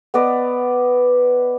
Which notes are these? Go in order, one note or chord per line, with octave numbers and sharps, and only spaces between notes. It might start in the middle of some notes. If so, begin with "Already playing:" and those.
B3 B4 D5 D#5